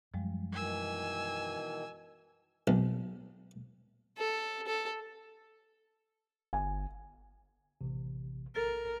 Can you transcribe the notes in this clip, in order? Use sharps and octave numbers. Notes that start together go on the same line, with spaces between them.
F#2 F3 G3 G#3
B2 D#3 E3 G#5 E6
B1
A4
A4
G1 G#5
A1 C3
A#1 A4 A#4 A6